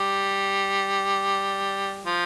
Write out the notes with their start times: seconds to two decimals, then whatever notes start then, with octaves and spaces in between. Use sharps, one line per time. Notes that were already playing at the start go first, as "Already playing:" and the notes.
Already playing: G3
2.05 F3